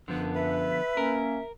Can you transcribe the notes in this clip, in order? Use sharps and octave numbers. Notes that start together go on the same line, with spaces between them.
F#2 D3 F3 B3 D4
B4 E5
A#3 C#4 A#4